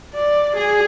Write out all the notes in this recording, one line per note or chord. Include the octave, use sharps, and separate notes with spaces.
D5
G#4 G#5